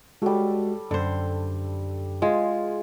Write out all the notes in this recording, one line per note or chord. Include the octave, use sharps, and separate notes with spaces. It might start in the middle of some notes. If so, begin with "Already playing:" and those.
G3 G#3 F#4 A4
F#2 D3 C5
G#3 F4 G#4